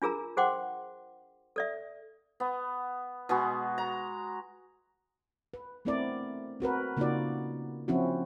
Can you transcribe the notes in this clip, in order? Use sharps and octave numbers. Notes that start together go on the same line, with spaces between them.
D4 F4 G#4 A#4 A#5
G#4 C5 F#5 G5 C6 D6
A4 D5 E5
B3
B2 G#3 B3 F#4
A#5
B4
A3 B3 C4 E4 A#4 D5
C4 F#4 A#4 B4
C#3 A#3 D#4 F4 F#4 D5
F3 C4 C#4 E4 F#4